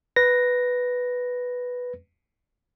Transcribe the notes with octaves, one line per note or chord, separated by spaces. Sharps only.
B4 A#6